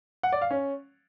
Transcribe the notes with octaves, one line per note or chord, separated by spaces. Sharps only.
F#5
D5
F5
C#4